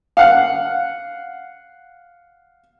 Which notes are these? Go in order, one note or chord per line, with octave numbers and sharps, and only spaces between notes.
F5 F#5